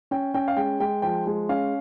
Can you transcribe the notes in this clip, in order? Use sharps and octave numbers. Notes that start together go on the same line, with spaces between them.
C#4 G5
C#4 G5
F5
G#3 G5
G#3 G5
F3 G5
G#3
C#4 F5